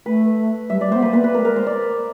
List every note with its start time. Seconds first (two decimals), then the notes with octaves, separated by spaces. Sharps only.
0.05 A3 B4
0.69 G3 E5
0.77 G#3
0.81 D5
0.87 A3
0.92 B3 C5
1.02 A#3 B4
1.13 B4
1.24 B4
1.34 A3 A#4
1.42 G#3
1.45 A#4
1.56 C5
1.66 D5